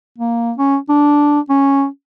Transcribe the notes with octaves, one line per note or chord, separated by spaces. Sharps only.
A#3
C#4
D4
C#4